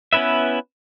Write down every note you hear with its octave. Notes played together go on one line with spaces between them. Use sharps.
B3 C#4 E4 B4 E5